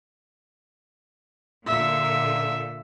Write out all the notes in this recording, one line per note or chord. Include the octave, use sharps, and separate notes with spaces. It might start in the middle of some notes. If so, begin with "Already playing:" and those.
A#2 D3 E5